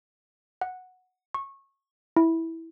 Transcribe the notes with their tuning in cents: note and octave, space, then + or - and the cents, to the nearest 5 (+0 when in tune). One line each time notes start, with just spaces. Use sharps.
F#5 -5
C#6 -20
E4 -10